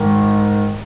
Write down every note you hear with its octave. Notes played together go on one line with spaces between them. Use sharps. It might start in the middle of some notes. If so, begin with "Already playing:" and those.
Already playing: G#2 D#3